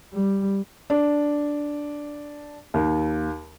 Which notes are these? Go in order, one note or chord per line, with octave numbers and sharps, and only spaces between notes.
G3
D4
D#2